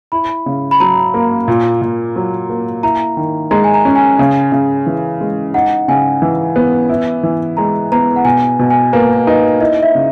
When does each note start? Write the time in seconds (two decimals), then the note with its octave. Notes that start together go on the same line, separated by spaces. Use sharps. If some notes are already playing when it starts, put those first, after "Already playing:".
0.12 E4 B5
0.46 C#3
0.71 B5
0.80 F#3 A#5
1.14 A#3
1.48 A#2
1.82 A#2
2.16 F#3
2.50 A#3
2.83 E4 A#5
3.17 D#3
3.51 G#3 A#5
3.64 G#5
3.74 A#5
3.85 C#4
3.96 G#5
4.19 C#3
4.52 C#3
4.86 E3
5.21 G#3
5.54 D#4 F#5
5.88 C#3 G#5
6.22 E3
6.56 B3
6.89 E4
7.23 E3
7.57 G#3 A#5
7.92 B3 A#5
8.16 F#5
8.25 B2 G#5
8.59 B2
8.70 G#5
8.93 A#3 B4
9.27 D#4 B4
9.60 E4 D#5
9.83 E5
9.95 C#3